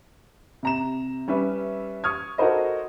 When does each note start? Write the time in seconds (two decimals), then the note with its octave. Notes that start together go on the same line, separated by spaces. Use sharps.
0.63 C3 A#5 E7
1.28 G3 C#4 B4 E5
2.04 C#6 D#6 F6 G#6
2.38 F#4 A4 A#4 C5 D#5